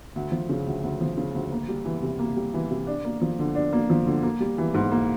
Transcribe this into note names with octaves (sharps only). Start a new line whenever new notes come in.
D2
F3
C#3
D2
D2
F3
C#3
D2
A#3
G3
E3
C3
A#3
G3
E3
C3
D4
A#3
F3
D3
D4
A#3
F3
D3
A#3
G3
E3
G#2
A#3